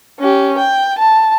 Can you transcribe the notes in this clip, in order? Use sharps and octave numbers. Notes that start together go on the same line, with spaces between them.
C#4 G4
G5
A5